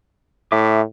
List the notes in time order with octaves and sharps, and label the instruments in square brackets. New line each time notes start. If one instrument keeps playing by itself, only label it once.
[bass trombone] A2 [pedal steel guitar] E5 D6